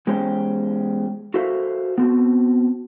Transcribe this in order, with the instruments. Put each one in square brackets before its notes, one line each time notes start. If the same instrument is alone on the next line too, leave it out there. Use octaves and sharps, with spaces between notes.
[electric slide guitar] E2 G#3 C#4 G4 C5
F#4 A4 A#4 C5 E5 F5
B3 C4 F#4